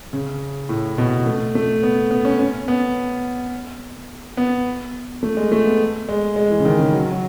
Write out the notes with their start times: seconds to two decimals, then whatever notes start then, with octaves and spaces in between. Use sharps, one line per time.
0.13 C#3
0.69 A2
0.98 B2
1.26 A3
1.55 A3
1.83 B3
2.11 B3
2.25 C#4
2.39 C#4
2.68 B3
4.37 B3
5.23 A3
5.37 G#3
5.52 A3
5.65 B3
6.09 G#3
6.36 G#3
6.50 E3
6.60 C#3
6.65 D#3
6.79 C#3
6.93 F#3
7.11 F#3